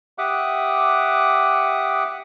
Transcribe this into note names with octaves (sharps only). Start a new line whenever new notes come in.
G4 E5 F#5 D6 D#6 F#6